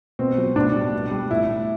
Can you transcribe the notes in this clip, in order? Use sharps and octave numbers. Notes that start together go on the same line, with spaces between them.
B2 C4
F#3
A2 D4
G3
B2
G3
A2 E4
A2